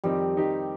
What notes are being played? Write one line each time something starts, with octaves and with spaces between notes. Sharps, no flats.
F2 D#3 G3 C4 D#4
D#3 C4 D#4 G4